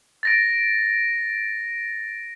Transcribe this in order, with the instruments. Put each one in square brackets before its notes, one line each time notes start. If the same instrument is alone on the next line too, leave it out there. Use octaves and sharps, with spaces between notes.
[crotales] A6 A#6 D7